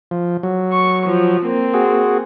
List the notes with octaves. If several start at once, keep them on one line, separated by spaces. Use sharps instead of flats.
F3
F#3
C#6
F3
A#3 C4
F#4 G#4